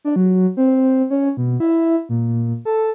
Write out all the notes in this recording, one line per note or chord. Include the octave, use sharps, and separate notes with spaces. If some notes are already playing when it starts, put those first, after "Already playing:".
D4
F#3
C4
C#4
B2
E4
A#2
A4